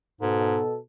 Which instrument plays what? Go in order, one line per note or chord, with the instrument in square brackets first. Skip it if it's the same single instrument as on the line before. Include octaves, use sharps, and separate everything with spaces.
[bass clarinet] G#2 [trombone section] B2 A4